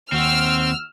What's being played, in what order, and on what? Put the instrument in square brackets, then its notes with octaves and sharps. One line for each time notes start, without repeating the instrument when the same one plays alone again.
[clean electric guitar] D#2 F#4 [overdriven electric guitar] C4 [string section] E6 F6